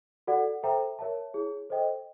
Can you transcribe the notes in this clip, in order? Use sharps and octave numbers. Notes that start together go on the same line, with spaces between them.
F#4 A4 D5 F#5
A4 C5 E5 G5 A#5
A#4 C#5 E5 A5
E4 G#4 C#5
A4 C5 D#5 G5